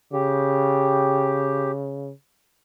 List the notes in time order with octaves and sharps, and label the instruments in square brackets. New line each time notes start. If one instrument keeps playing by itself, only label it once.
[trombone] C#3 [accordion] G4